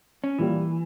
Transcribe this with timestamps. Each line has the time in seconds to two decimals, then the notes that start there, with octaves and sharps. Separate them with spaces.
0.24 C#4
0.39 A#2 E3 G3 A#3